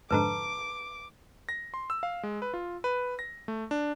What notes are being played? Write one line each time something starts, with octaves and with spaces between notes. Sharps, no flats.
F2 G#2 D3 B4 A5 A#5 D6
A#6
C6
E6
F5
G#3
B4
F4
B4
A#6
A3
D4